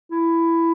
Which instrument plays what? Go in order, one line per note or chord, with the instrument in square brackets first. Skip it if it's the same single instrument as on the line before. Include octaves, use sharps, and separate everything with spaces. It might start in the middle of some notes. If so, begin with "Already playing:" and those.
[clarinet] E4